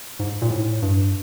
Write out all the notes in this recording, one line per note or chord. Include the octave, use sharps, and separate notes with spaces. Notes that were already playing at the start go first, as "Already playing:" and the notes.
G#2
A#2
A2
G2